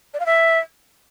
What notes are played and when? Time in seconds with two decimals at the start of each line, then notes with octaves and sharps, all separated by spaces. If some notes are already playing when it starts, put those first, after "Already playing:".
0.14 D5
0.20 F5
0.26 E5